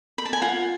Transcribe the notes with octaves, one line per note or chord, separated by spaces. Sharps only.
B5
A5
G#5
F4 F#5